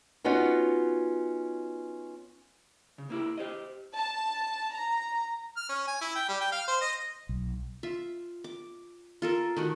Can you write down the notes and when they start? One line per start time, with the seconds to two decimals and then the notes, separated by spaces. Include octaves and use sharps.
0.24 B3 C#4 D#4 F4 F#4
2.98 C#3
3.10 A#3 E4 G4
3.38 G4 C5 D#5
3.97 A5
4.73 A#5
5.57 F6
5.69 C#4
5.88 G#5
6.01 E4
6.16 G5
6.29 G3
6.41 G5
6.52 F5
6.68 C5
6.81 D#5
7.29 B1
7.83 F4 E5
8.44 D6
9.22 F4 A4 A#4
9.57 D#3 A3 F#4